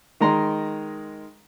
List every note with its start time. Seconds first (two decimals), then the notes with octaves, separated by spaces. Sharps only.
0.21 D#3 G#3 A#5 C6